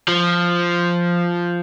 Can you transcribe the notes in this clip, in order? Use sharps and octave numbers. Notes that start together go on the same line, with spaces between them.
F3